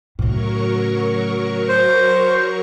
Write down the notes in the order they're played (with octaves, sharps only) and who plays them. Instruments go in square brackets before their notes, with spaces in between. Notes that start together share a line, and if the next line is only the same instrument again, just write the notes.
[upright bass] A2 C#3 [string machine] F#3 A#4 C#6
[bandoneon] C5